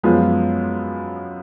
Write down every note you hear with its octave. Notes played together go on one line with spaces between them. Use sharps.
F#2 F3 G#3 B3 F4